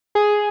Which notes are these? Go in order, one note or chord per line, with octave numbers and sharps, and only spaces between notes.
G#4